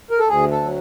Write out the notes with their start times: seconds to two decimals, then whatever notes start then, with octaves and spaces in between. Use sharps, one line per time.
0.10 A#4
0.19 A4
0.28 D2 G#4
0.51 A4
0.63 F#3